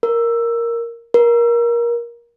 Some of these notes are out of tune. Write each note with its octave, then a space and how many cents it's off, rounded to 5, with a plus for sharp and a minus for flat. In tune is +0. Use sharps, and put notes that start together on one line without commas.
A#4 +0
A#4 +20